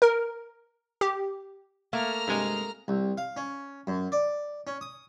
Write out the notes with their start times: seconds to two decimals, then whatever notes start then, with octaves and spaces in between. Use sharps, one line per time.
0.02 A#4
1.01 G4
1.93 A3 A#3 A#5 F6
2.27 G2 C3 G#3
2.88 C2
3.18 F5
3.37 C#4
3.87 F#2
4.12 D5
4.67 C#4
4.81 D#6